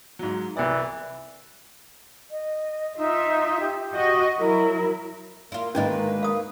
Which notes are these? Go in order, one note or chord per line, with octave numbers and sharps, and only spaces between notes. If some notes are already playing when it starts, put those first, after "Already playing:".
G#2 F#3
C2 E3 D5
D#5
D#4 F4 E5
G4
F#4 D#5
F#3 E4 A#4
A#3 E4 F4
D2 G#2 D#3 A#3 C#4 D#4 B4 D#5
F5 D#6